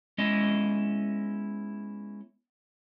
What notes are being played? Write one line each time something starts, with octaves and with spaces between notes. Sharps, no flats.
G#3 B3 C#4 E4 D#5